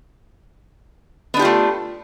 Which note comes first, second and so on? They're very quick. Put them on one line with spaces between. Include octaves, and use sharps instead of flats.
B3 D4 G4 F4 A3